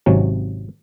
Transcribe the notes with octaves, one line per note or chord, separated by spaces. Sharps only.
G#1 C3 F#3 C#4